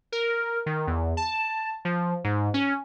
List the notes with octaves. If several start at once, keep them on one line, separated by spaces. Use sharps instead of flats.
A#4
D#3
E2
A5
F3
G#2
C#4